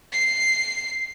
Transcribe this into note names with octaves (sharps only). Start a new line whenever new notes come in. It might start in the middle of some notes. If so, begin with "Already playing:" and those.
C7